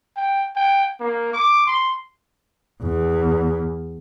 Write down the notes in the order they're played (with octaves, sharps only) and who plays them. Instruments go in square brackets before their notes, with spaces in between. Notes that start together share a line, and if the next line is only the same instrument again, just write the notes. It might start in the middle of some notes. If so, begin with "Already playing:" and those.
[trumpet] G5
G5
A#3
D6
C6
[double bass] E2